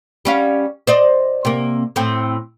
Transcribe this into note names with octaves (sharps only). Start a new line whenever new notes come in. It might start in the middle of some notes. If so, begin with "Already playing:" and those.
G3 C#4 F5
C5 D5 D#5
C3 A#3
A2 C4